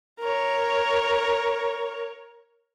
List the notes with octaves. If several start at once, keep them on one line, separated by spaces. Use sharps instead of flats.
A#4 C#5